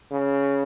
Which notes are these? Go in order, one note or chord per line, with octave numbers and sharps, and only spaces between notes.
C#3